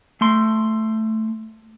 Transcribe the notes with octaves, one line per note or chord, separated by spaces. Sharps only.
A3 C6